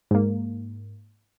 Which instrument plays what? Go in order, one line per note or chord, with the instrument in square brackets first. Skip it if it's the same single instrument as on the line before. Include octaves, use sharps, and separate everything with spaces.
[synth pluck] G#2 A#3